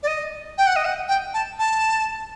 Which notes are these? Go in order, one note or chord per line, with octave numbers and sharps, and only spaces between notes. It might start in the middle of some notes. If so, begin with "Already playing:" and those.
D5
D#5
G5
F#5
D#5
F#5
G5
A5
A5